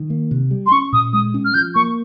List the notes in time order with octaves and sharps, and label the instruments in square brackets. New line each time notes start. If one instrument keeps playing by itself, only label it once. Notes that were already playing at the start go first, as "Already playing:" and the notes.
Already playing: [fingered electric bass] D#3
A#3
C3
G3
[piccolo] C6
[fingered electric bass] C#4 [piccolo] C#6
[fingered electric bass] A#2 [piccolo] D#6
[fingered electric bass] G#3 [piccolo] D#6
[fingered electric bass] C#4
[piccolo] F6
[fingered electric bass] F3 [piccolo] G6
[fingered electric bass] A#3 [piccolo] C#6